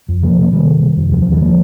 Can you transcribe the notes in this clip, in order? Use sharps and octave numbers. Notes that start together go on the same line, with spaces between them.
F2
C3 F3 A#3
C3 A#3
C3 D#3 G3
C3
C3
F2
D#2 F3
F3
D#2
D#3 G3
F3 A#3